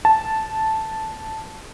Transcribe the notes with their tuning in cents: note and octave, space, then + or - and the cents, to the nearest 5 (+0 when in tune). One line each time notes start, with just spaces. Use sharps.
A5 -5